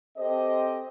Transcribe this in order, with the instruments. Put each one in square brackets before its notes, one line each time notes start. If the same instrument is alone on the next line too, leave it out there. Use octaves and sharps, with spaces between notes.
[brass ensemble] C4 G4 A4 C5 D#5